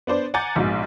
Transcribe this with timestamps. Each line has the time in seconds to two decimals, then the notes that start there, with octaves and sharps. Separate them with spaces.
0.07 B3 D4 C5 D5
0.34 F#5 G#5 A#5 D6 G6 A6
0.56 A#1 G#2 B2